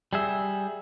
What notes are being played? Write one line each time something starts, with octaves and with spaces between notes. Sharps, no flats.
G3 G#4 E5